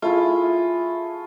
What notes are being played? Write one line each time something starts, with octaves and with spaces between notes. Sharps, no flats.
A3 E4 F4 G#4